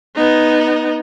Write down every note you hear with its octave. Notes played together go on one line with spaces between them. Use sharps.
B3 D#4